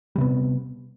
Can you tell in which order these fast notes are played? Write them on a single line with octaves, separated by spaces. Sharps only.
G3 C3 B3